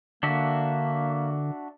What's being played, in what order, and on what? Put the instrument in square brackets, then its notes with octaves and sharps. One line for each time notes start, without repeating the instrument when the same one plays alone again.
[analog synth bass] D3 [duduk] A#3 [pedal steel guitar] D4 F#4 E5